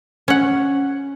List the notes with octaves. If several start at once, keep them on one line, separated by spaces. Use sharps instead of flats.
C#4 F#5